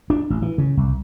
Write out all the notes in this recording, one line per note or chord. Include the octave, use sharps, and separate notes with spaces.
D4
A1
E3
C#3
C2